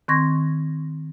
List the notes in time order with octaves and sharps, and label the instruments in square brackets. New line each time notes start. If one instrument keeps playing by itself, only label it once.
[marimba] D#3 C4 C6 C#6 G#6 A#6